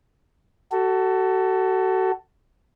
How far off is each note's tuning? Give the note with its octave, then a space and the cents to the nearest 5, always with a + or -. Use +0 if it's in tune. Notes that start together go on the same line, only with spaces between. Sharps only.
F#4 +30 A4 +10